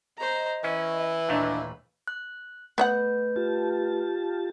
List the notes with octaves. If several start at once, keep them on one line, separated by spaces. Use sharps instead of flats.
C5 D#5 A#5
E3 C#4 B4
D#2 A#2 A3 D4 D#5
F#6
A3 B3 B4 E5 F#5 G6
F4 G4 A5